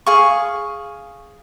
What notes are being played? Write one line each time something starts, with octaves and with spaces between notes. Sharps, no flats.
G#4 F5 C#6